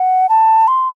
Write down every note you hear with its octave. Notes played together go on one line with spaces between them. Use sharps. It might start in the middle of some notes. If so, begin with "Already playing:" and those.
Already playing: F#5
A5
C6